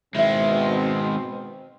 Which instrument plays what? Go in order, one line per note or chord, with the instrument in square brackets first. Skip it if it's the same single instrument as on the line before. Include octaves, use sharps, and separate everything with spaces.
[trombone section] B2 C4 [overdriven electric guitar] D#3 G#3 [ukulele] E4 E5